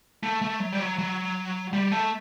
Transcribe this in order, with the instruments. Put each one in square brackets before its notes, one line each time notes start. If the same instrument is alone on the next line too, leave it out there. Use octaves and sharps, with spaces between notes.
[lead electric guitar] A3
A3
F#3
G3
F#3
F#3
G3
A3